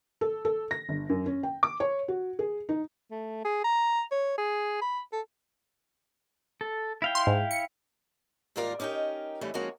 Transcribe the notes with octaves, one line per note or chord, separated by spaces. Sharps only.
A4
A4
A#6
G1
F#2
C#4
G5
D6
C#5
F#4
G#4
D#4
A3
G#4
A#5
C#5
G#4
B5
A4
A4
E4 F5 G5
C6
G#2
C#7
D#2 G#2 G3 F4 A#4 D5
C#4 D#4 G4 A#4 G5
E3 G3 A3 C#4
F3 G#3 A#3 C#4 F#4